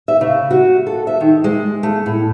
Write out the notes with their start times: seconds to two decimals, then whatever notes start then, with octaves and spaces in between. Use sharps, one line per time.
0.08 E5
0.21 C#3
0.51 F#4
0.87 A4
1.07 E5
1.21 D#3
1.44 G#3
1.83 A3
2.06 A2